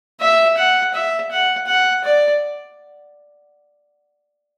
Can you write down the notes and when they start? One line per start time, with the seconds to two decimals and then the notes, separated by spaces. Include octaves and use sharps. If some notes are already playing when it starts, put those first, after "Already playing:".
0.20 E5
0.57 F#5
0.94 E5
1.31 F#5
1.67 F#5
2.04 D5